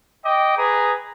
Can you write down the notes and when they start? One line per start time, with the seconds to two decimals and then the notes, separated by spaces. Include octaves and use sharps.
0.25 D#5 G5 D6
0.57 G#4 B4 A#5